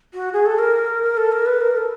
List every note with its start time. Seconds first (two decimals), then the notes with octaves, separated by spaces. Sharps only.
0.14 F#4
0.33 G#4
0.46 A4
0.58 A#4
1.02 A#4
1.17 A4
1.32 A#4
1.46 B4
1.60 A#4
1.76 A4